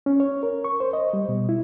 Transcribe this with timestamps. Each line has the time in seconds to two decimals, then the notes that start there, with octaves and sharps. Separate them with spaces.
0.06 C#4
0.20 C#5
0.43 A#4
0.64 C#6
0.80 C5
0.93 D#5
1.13 G3
1.29 B2
1.49 E4